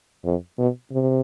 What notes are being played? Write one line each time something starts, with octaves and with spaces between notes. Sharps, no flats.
F2
B2
C3